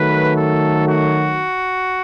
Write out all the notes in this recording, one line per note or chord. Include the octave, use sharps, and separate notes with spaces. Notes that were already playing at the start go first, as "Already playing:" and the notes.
Already playing: D#3 F#3 A3 B4
A4
F#4